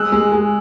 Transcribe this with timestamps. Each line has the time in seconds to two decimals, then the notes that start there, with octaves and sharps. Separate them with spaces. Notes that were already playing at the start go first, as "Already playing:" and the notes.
Already playing: G#3 E6 F#6
0.12 G#3
0.32 G#3